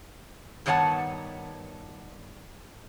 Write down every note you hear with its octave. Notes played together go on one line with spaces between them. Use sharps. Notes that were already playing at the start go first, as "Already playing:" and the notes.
G2 D#3 B3 C#5 F#5 A5